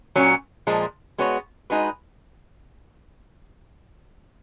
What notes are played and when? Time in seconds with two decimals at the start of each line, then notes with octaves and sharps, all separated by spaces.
0.16 A#2 F#3 C#4
0.67 A#2 F3 G#3
1.18 G#3 B3 F#4 C#5
1.70 G#3 D#4 F#4 B4